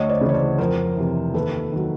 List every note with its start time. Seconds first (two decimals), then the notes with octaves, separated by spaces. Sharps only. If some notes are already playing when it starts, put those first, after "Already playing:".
Already playing: D2 C#5 D#5
0.09 C5 D5
0.21 C#3 E3
0.29 C#5
0.34 C5 D5
0.58 F2 A#4 C5
0.97 C3 E3
1.34 D#2 A4 B4
1.72 D#3 F#3